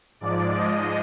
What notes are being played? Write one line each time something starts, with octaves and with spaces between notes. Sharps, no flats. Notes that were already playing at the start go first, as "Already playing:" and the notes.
G#2 F3 G#3 D5
G#2 F3 G#3 D#5